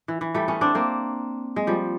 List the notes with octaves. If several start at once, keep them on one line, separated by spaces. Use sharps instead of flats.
E3
E3
G3 A3
B3 C#4
C4 D4
A#3 C4
G#3
F3 G3